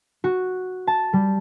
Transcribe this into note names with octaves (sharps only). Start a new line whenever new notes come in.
F#4
A5
G3